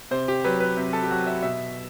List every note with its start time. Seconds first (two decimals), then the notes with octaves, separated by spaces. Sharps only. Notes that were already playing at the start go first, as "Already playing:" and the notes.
0.11 C3 C5
0.28 G4
0.44 F#3 B4
0.60 B4
0.77 C3
0.93 A4
1.03 G4
1.10 F#3 F#4
1.26 E5
1.42 B2 E5